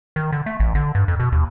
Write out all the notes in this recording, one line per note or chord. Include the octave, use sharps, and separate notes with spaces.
D#3
D3
A3
A1
D3
G2
F2
B2
D#2